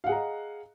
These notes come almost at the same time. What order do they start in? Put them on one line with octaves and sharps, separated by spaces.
F5 F#5 G#4 A#5 D#5